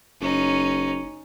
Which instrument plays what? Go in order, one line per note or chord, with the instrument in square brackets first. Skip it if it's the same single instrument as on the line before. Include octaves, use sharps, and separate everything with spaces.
[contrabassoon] F#1 [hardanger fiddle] C#4 D#4